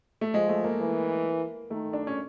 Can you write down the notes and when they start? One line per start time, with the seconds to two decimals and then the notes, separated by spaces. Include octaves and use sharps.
0.21 A3
0.34 F3 G#3
0.49 A3
0.64 A#3
0.79 E3
1.70 D#3 A3
1.93 D4
2.07 C#4